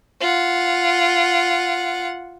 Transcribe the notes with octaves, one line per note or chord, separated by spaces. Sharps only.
F4 F#5